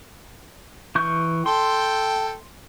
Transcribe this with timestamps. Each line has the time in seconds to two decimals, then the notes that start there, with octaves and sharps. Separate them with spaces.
0.95 E3 C#6 G6
1.46 A4 G5 C6